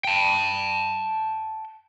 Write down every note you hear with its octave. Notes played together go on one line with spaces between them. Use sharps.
G5 A5